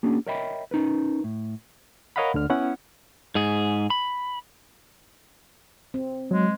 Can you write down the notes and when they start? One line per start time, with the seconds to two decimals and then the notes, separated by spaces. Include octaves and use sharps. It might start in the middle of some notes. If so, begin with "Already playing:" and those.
0.03 A#3 C#4 D4 F#4 G#4
0.27 A#4 C#5 D#5 E5 G5 B5
0.71 C#4 D#4 A#4 B4
1.24 A2
2.16 A#4 C#5 D#5 F5 F#5 B5
2.34 D2 D3 F6
2.50 B3 C#4 E4 F#5
3.35 G#2 G#4
3.90 B5
5.94 C4
6.31 F#3 G#3